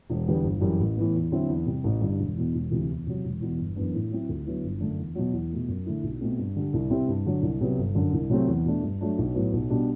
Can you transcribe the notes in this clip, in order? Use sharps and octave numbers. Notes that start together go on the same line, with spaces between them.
E1
E2 D3 G3 B3
G1
F#2 E3 G3
A1
A2 E3 B3
E2
D3 F#3 C4 E4
E2
C3 G3
A1
G2 D3 G3
E1
E2 B2
E1
D2 C3 E3
E2
C3 F#3
E1
E2 B2
G1
F#2 E3 B3 D4
A2
F#3 C4 E4
D2
D3 F#3 B3 E4
G1
F#2 D3 A3 D4
E2
B2 F#3
E2
B2 A3
F#2
D3 A3 E4
B1
B2 A3 C4
G2
D3 G3
C2
C3 G3 C4 E4
G2
D3 F#3
C2
C3 F#3 B3
G1
F#2 D3
C2
C3 F#3 A3 C4
E2
B2 A3 D4
G2
F#3 A3 D4
B1
A2 F#3 B3
B1
B2 G3 D4